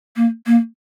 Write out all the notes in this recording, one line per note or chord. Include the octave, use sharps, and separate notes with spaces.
A#3
A#3